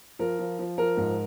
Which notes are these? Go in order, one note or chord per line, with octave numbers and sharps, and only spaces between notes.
F3 A#4
F3
F3
F3 A#4
G#2